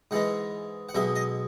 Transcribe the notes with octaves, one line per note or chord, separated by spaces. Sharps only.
G#2 E3 G#3 F#5
F#5
B1 B2 G#3 E5
D#5